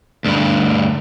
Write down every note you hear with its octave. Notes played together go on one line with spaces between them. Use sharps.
D2 G2